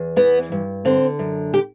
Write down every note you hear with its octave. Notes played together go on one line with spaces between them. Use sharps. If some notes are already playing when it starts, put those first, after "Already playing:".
Already playing: E2
E3 B3
G2
D3 C4
F#2
G4